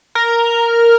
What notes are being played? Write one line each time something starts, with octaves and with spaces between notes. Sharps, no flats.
A#4